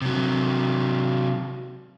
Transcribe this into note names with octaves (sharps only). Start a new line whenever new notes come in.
C3 F#3